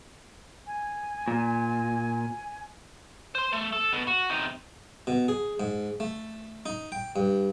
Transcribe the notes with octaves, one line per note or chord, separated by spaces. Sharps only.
G#5
A#2
C5 C6
A3
A4
B2
F#4
C3 D#4
B2
G#4
G#2
A3
D#4
G5
G2